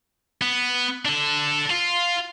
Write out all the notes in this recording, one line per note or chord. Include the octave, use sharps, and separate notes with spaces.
B3
D4 A4
F4